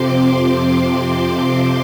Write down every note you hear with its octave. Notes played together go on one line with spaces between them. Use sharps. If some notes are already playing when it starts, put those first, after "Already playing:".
Already playing: F2 C3 F3 C4 C6 D6
D6